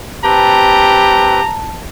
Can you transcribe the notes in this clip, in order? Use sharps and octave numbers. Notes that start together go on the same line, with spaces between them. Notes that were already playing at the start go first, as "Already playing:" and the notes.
C4 G4 B4 A5 A#5